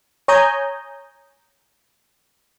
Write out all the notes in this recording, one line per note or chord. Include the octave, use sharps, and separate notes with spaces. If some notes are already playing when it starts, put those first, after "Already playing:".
C#5 G#5 A#5 D#6 G6